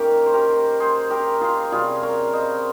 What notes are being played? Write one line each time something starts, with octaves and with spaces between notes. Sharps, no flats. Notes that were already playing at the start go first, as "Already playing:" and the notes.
Already playing: D#3 A#3 C#4 G4 A#4
C5
G4 A#4
G#4 C5
G4 A#4
F4 G#4
C3 G3 C#4 F4 G#4
A#4 C#5
C5 D#5